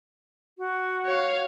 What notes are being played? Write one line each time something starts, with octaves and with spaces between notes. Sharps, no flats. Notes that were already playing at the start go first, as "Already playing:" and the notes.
F#4
C#5 F5